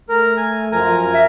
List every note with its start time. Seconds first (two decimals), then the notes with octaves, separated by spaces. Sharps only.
0.09 A3 A#4
0.37 G#5
0.72 F#2 F3 A#4 G#5 A#5
1.14 G4 E5